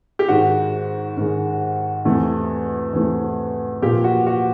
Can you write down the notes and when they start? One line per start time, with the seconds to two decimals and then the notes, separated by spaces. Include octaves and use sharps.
0.19 G4
0.28 G#2 D#3 G#3 F#4
1.17 G#2 D#3 G#3
2.05 E2 C3 E3 A3
2.93 E2 C3 E3 A3
3.82 A#2 F3 A#3 G4
4.04 F#4
4.27 F#4